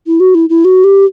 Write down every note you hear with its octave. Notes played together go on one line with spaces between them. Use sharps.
E4
F#4
E4
E4
F#4
G4